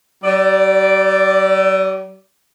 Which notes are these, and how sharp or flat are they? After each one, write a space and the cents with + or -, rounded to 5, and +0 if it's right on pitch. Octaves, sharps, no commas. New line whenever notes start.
G3 -45 D5 -5